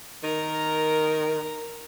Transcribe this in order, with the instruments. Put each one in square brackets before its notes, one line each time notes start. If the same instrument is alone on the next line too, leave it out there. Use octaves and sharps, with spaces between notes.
[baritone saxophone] D#3 [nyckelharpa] A#4 A#5